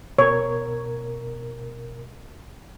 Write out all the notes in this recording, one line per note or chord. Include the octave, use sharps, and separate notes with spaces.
B2 A#4 C#5